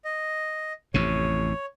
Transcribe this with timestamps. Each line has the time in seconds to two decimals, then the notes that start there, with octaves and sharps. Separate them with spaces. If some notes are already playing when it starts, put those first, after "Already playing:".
0.05 D#5
0.94 A1 F2 C3 C#5